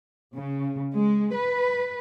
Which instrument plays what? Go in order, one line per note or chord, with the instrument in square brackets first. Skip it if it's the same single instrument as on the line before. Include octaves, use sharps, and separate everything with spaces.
[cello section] C#3
G#3
B4